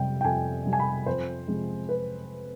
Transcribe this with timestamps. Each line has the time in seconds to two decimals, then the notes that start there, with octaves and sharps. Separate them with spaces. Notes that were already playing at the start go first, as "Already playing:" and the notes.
Already playing: F2 C3 G3 G5
0.21 G5
0.24 F2 G#5
0.65 C3 G3
0.73 G#5
0.80 B5
1.06 F2 C5
1.48 C3 F3 G#3
1.89 B4